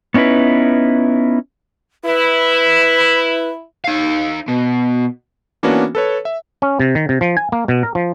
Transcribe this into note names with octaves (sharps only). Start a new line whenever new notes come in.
B3 C#4 D#4 E4 B4
E4 B4
D#4 F5
B2
E3 A#3 B3 C#4 D4 F#4
A4 B4 C#5
E5
C#4
C3
D#3
C3
F3
G#5
A#3
B2
A#4
F3